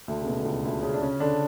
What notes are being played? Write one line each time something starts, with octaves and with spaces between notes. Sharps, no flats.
D2 D3
C#3
B2
D3
C#2 C#3
D2 D3
C#3 C#4
D4
C#3 C#4
D3 D4